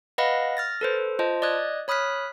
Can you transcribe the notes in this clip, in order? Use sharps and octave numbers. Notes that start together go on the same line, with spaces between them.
B4 D#5 F5 F#5 B5 A#6
F6 A6 A#6
A4 B4 C5
F4 C5 D#5 A5
D5 D#5 D#6 F#6 G#6
C#5 B5 D#6 F6 F#6 B6